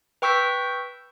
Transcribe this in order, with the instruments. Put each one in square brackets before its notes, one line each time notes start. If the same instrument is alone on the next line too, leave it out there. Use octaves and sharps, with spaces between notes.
[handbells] B4 G5 C#6 E6 G6 B6